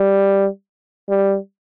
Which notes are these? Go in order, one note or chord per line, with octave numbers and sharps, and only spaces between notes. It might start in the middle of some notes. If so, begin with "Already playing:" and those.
Already playing: G3
G3